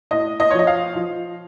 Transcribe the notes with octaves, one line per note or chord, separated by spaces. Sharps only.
A2 D#5
D#5
F3 C#5
D#5
F5
F3